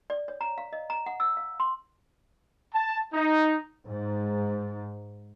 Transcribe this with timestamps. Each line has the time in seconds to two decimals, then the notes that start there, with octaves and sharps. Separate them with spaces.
0.10 D5
0.28 C#5
0.41 A#5
0.58 F5
0.73 D#5
0.90 A#5
1.06 F#5
1.20 E6
1.37 F5
1.60 C6
2.74 A5
3.13 D#4
3.87 G#2